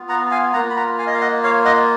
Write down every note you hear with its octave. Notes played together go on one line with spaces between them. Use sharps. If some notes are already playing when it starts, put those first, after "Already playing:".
Already playing: B3 F4
F#5 A#5
F5 G#5
A#3 F4 F#5 A#5
B5
F#5 A#5
F5 G#5
D#5
F5
D#5 F#5
C#5 F5
D#5 F#5